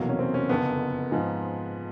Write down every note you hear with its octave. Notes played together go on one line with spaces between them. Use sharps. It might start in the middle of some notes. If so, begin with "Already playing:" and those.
Already playing: F1 E2 B2 F#3 A#3
C#4
C4
C#4
F#1 F2 D3 B3
G#2 F3 G#3